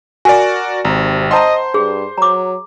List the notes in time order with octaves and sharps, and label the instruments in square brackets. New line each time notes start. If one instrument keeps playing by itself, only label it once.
[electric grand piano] F#4 A#4 D5 [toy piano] G#5
[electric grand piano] G#1 [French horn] C3 [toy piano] A#5
[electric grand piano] C5 C6 [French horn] D#5 [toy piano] F#5 A5 A#5
[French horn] G2 [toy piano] G#4
[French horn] F#3 [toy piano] A#5 D6